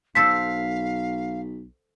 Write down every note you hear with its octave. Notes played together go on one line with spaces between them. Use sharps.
B1 A4 C5 F5 B6